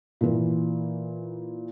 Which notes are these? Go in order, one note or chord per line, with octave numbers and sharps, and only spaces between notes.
A#2 E3